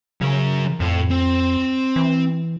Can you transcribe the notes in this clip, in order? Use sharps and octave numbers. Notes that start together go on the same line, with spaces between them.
C#3 F#3 A#4
F2 A2
C4
E3